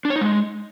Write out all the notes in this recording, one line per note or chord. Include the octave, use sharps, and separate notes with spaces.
D4
C#5
D#4
G#3